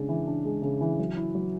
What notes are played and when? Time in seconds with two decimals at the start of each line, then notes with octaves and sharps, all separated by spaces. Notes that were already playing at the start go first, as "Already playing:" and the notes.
Already playing: C#3 G#3 D4
0.09 E3
0.27 D4
0.45 G#3
0.62 C#3
0.81 E3
0.99 F#3
1.17 E4
1.35 F#3